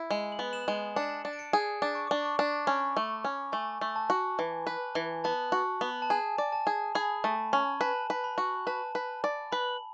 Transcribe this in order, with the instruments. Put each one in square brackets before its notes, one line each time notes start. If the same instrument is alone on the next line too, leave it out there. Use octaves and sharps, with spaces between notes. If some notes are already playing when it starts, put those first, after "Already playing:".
Already playing: [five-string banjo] E4
G#3
[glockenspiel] F#7
[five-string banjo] B3
[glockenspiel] E7
[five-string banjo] G#3
[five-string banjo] D4 [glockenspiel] C#7
[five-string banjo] D4
[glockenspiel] D7
C#7
[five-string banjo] G#4
[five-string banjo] D4 [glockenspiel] D6
[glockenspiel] C#6
[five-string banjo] D4 [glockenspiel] D6
[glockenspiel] C#6
[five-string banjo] D4
[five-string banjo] C#4 [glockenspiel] B5
[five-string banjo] A3
C#4
[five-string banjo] A3 [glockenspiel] G#5
[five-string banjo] A3
[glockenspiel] A5
[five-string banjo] F#4
E3
B4
E3
[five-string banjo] B3 [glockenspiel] A5
[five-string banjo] F#4
B3
[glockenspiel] A5
[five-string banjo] G#4 [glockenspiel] G#5
[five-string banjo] D5
[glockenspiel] A5
[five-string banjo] G#4
[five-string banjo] G#4 [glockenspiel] B5
[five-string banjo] A3 [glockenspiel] A5
[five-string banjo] C#4 [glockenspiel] B5
[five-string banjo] B4 [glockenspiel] A5
[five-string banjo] B4
[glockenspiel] B5
[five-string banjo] F#4
[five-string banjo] B4 [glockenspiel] A5
[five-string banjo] B4
D5
[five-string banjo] B4 [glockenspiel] B5